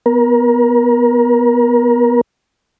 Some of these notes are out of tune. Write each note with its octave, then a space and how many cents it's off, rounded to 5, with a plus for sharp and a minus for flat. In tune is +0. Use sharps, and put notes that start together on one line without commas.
B3 -5 A#4 +30